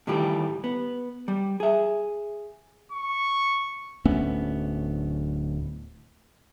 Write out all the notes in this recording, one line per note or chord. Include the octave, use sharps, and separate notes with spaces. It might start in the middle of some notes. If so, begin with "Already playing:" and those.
A2 D#3 E3 G3 G4
B3
G3
G#4 E5
C#6
D1 A3 B3 C#4